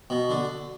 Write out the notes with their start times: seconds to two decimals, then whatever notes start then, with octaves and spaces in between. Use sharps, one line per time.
0.10 B2
0.30 D3